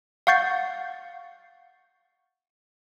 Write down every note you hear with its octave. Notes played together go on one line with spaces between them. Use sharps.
F5 F#5 C#6 G6 A6 C7